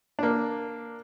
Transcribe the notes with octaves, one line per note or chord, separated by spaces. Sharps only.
A#3 D4